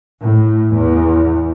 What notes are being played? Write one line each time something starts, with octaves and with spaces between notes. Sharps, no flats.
A2
E2